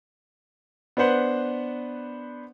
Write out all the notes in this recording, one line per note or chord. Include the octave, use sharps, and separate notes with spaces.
B3 D4 B4 C5 F#5